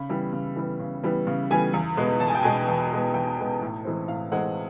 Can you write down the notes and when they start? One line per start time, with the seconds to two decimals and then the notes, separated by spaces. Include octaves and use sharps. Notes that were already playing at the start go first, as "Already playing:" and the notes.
Already playing: C#3 B5
0.09 E3 G3 B3
0.33 C#3
0.56 E3 G3 B3
0.79 C#3
1.03 E3 G3 B3
1.27 C#3
1.51 E3 G3 B3 G#5
1.74 E2
1.97 B2 G#3 B3
2.20 E2 A5
2.28 G#5
2.35 G5
2.43 B2 G#3 B3 G#5
2.68 E2
2.91 B2 G#3 B3
3.14 E2 G5
3.38 B2 G#3 B3
3.61 A2
3.85 E3 G#3 C4
4.08 A2 F5
4.32 E3 G#3 C4 F#5